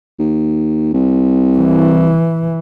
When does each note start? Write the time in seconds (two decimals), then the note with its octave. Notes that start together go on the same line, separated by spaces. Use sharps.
0.19 D#2
0.93 C2
1.58 E3